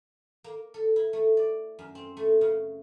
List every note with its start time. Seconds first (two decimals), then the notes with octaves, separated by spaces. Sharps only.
0.44 A#3
0.74 A4
0.96 E4
1.13 A3
1.37 D5
1.79 F#2
1.95 C4
2.17 A3
2.41 C#3